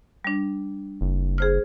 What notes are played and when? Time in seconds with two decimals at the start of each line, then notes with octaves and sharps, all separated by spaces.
0.25 G3 D4
1.01 F#1
1.38 G#4 C5 F6